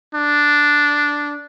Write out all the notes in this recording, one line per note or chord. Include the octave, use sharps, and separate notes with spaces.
D4